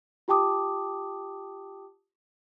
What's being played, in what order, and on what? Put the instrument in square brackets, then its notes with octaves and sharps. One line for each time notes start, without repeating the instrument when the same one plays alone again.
[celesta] F4 G4 G5 A5 D6 D#6